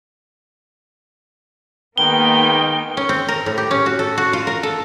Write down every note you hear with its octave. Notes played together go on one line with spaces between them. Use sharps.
D#3 G#3 A#3 B3 D#4 G5 G7
C#4
C4
A#4
A2
G4
C#4
F#4
A4
F#4
F4
A#4
A4